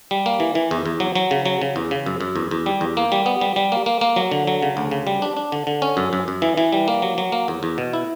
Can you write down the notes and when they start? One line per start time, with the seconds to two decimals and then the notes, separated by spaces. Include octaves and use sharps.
0.11 G3
0.26 A#3
0.40 E3
0.55 E3
0.71 E2
0.86 E2
1.00 F#3
1.15 F#3
1.31 C#3
1.46 F#3
1.62 C#3
1.76 E2
1.91 C#3
2.06 F#2
2.21 F#2
2.36 E2
2.51 E2
2.66 G3
2.81 E2
2.97 A#3
3.12 G3
3.26 B3
3.41 G3
3.56 G3
3.72 A#3
3.86 A#3
4.01 A#3
4.16 F#3
4.32 D3
4.47 F#3
4.63 C#3
4.77 D2
4.91 C#3
5.07 G3
5.22 D4
5.37 D4
5.52 D3
5.67 D3
5.82 C#4
5.97 F#2
6.13 F#2
6.28 F#2
6.42 E3
6.57 E3
6.72 G3
6.88 A#3
7.02 F#3
7.18 F#3
7.32 A#3
7.48 E2
7.63 E2
7.78 B2
7.93 E4